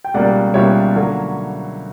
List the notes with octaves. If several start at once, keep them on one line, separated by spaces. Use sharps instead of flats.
G5
C#2 B2 G3 A#3 D5 F#5
C#2 B2 G3 A#3 C#5 E5
D3 F#3 A#3